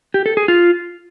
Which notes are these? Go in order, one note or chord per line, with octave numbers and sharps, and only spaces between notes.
G4
A4
G#4
F4